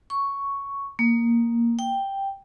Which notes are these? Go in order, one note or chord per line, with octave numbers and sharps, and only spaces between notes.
C#6
A#3
G5